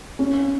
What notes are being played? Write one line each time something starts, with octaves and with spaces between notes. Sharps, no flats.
C#4